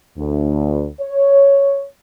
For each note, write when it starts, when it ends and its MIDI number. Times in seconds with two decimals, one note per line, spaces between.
0.17 0.87 38
1.00 1.85 73